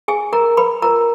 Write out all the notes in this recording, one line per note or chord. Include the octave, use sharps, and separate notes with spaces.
G#4 G#5
A#4 A#5
B4 B5
F4 A#4 B4 A#5